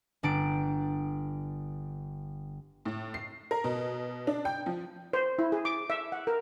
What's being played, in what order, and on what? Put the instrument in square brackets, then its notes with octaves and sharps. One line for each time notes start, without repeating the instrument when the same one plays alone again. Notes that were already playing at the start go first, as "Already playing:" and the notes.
[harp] G1 D4 D7
[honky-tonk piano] A2
C7
A#4
B2
D4
G5
F3
[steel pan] C5
E4
G#4
D6
E5
F#5
A#4